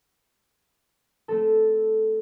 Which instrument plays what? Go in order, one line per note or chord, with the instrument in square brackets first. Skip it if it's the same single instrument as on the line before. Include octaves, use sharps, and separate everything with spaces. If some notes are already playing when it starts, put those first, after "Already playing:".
[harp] A3 C4 A4